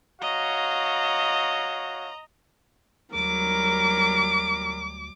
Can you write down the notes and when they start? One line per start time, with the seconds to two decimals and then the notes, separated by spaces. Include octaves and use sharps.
0.21 F#4 C#5 D#5 F5 A#5
3.14 D2 F#3 G3 A#4 D6